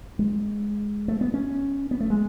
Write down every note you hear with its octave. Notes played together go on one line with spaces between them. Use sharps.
G#3
A3
B3
C#4
B3
A3
G#3